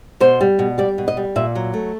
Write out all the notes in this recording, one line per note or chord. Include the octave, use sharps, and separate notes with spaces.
B2 C5
G3
B2
G3 D5
B2
D#5
G3
A#2 E5
F#3
A3